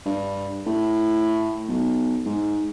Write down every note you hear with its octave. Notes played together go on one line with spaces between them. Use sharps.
G2
A2
B1
G#2